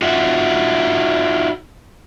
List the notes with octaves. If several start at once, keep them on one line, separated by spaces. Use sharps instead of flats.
D#4 F4 F#4 E5 F#5